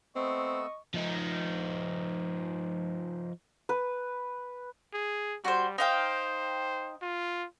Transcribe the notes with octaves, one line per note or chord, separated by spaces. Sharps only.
A3 B3 C4 D#5 C#6 E6
F3 D#4
B4
G#4
G3 F#4 C5
D#4 C5 F5 G5
F4